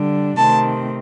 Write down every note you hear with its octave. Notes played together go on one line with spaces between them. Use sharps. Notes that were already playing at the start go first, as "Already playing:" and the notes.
Already playing: D3 G3 D4
C3 D#3 A3 C4 A5